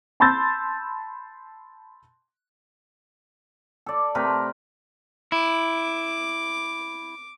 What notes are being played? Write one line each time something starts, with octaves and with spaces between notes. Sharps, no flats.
A5 B5 C6 E6 G6 A6
A4 D5
C3 A3 A#4 B4
E4 D6